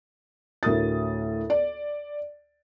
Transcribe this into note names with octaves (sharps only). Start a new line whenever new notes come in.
D2 A2 A#4 D#6 A6
D5